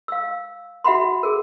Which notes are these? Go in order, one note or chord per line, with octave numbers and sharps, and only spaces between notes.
F5 E6
F#4 E5 F#5 B5 C6
G#4 A#4